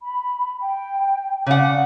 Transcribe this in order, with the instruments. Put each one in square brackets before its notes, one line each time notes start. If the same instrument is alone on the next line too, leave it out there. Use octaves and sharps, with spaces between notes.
[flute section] B5
G5
[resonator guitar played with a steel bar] C#3 F#5 [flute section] D5 F5 D6